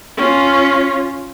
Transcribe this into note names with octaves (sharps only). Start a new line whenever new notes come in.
C#4 F4